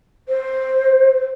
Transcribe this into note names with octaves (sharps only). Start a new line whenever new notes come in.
C5